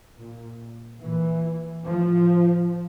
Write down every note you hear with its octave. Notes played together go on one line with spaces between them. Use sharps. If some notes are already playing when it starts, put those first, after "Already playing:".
A#2
A#2 E3
A2 F3